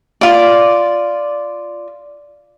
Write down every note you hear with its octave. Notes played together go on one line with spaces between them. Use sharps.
F4 D5